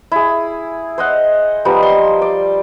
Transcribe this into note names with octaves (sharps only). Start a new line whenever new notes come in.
E4 G#4
C5 D#5 F#5
F3 G3 B3 D#4
C6
D5